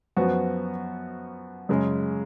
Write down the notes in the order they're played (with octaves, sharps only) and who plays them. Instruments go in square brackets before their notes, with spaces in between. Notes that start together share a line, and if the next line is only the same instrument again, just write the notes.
[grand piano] F#2 F3 B3 F#4
F#2 C#3 G#3